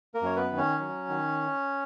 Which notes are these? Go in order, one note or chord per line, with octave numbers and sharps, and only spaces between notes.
A#3 A#4
F#2 C#5
B3 B4
D#3
C#4 C#5
F#3
D#3